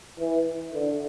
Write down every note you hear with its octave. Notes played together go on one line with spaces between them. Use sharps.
E3
D3